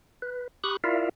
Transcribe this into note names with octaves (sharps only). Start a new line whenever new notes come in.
B4
G4 B5 C#6 D#6 F#6
E4 F4 A#4 D5 E5 F5